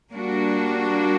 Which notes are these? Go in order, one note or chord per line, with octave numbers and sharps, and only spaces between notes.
G3 A#3 D4 F#4